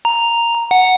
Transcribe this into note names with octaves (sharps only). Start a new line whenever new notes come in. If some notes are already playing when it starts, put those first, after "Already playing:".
A#5
F#5